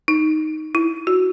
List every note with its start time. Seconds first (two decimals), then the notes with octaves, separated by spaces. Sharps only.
0.08 D#4
0.75 E4
1.07 F#4